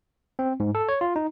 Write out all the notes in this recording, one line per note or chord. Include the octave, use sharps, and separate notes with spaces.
C4
G#2
A4
C#5
F4
D#4